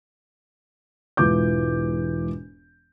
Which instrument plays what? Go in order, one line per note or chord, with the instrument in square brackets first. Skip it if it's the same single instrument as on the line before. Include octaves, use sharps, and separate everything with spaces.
[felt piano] E1 G#2 E3 F4 D6 G6